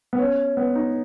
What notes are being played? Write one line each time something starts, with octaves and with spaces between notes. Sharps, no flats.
B3
C#4
B3
D#4